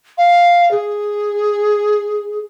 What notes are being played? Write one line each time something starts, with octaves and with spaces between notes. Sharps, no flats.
F5
G#4